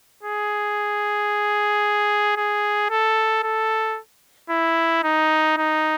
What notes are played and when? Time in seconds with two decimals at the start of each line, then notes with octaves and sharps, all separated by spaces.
0.23 G#4
2.37 G#4
2.90 A4
3.43 A4
4.50 E4
5.04 D#4
5.57 D#4